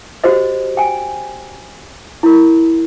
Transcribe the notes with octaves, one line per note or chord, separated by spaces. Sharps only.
F#4 G4 C5 D#5
G5 G#5
E4 A#4